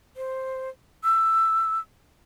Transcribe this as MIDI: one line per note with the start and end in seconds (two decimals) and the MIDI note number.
0.17 0.69 72
1.04 1.79 88